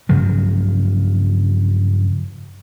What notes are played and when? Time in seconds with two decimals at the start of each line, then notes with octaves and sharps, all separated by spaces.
0.09 G2 C#3 F3 F#3